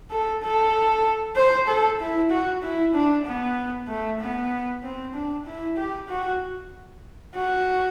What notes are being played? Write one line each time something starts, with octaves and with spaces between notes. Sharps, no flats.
A4
A4
C5
A4
E4
F#4
E4
D4
B3
A3
B3
C4
D4
E4
G4
F#4
F#4